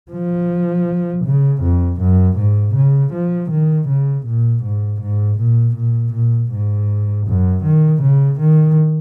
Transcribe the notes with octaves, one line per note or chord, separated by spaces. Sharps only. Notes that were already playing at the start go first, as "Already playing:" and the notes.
F3
C#3
F2
F#2
G#2
C#3
F3
D#3
C#3
A#2
G#2
G#2
A#2
A#2
A#2
G#2
F#2
D#3
C#3
D#3